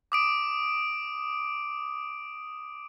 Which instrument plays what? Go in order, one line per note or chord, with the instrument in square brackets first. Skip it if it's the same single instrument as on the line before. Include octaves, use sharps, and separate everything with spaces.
[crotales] D6 D#6 D7